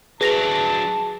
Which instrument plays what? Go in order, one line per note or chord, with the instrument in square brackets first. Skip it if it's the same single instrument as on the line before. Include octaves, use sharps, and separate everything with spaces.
[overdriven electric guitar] F#3 D4 [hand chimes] G#4 [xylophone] B4 A#6 F7 [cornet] A5